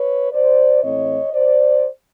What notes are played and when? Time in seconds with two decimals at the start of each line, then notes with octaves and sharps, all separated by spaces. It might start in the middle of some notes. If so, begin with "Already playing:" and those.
Already playing: B4 C#5
0.32 C5 D5
0.83 A2 E3 A3 C4 C#5 D#5
1.34 C5 D5